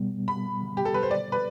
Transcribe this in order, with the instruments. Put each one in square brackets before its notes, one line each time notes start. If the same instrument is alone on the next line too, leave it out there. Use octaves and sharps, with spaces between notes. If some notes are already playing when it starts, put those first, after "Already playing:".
Already playing: [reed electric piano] B2 G3 B3
[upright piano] B5
G4
A4
B4
C5
D5
B4